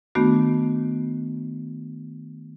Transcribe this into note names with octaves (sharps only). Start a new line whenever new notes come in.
D#3 A3 B3 D4 F#4